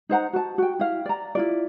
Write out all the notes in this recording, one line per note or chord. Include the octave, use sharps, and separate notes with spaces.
D#4 C5 F#5 A#5
F#4 A5
F#4 G5
E4 F5
D5 A#5
E4 F4 D5